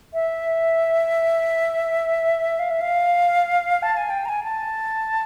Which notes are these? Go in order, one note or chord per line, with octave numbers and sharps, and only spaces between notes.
E5
F5
E5
F5
A5
G#5
G5
A#5
G#5
A5